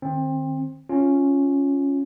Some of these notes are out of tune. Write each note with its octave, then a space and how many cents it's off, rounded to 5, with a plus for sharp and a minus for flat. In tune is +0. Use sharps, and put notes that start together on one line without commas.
D#3 -30 C4 +20
C#4 +0 F4 +0